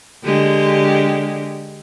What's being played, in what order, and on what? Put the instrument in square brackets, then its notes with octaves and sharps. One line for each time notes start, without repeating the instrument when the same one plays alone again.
[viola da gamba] D3 G#3 G4